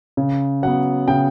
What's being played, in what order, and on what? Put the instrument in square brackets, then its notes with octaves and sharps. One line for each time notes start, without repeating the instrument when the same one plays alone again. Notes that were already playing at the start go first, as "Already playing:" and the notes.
[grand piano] C#3
F#3 B3 F#5
C#3 G5